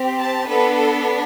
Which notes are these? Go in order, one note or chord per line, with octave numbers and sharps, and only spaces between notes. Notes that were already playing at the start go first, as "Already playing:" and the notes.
Already playing: C4 G4
A5
B3 D4 A4 B4
A4